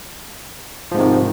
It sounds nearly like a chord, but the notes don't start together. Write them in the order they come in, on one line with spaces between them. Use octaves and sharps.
F3 G#2 C3 D#3